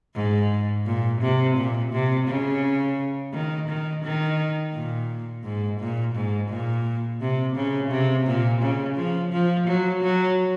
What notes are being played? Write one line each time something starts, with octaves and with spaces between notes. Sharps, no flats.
G#2
A#2
C3
A#2
C3
C#3
D#3
D#3
D#3
A#2
G#2
A#2
G#2
A#2
C3
C#3
C3
A#2
C#3
F3
F3
F#3
F#3